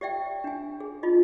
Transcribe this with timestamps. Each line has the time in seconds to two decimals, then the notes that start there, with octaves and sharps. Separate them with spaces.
0.01 G4 D5 E5 G5
0.44 D4 G#5
0.80 G#4
1.03 D#4 F4 D#5